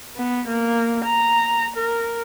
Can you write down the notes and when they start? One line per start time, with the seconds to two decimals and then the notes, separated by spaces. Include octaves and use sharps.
0.17 B3
0.48 A#3
1.05 A#5
1.77 A#4